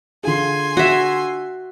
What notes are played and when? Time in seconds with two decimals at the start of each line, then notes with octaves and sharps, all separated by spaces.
0.23 D3 F4 G#4 G#5 C6
0.77 F#4 E5